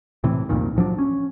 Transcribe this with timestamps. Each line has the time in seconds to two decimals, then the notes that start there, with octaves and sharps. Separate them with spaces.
0.24 A2 C3 E3
0.49 C2 F2 A#2 D#3
0.76 A2 F3 F#3 D4
0.99 C#4